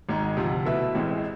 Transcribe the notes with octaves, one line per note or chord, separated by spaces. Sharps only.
G#1 G#2 G#3
D2 C3 F3
B2 A3 E4 B4 E5
A1 A2 E3 G#3 C4